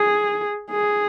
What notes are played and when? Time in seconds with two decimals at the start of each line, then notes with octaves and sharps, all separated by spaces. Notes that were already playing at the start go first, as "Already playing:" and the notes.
Already playing: G#4
0.71 G#4